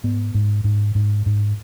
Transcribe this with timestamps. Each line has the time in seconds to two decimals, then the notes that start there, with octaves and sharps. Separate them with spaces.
0.04 G#2 B3
0.34 G#2
0.64 G#2
0.95 G#2
1.26 G#2